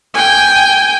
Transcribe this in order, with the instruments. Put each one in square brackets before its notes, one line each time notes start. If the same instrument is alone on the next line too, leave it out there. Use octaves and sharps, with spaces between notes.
[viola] G5 G#5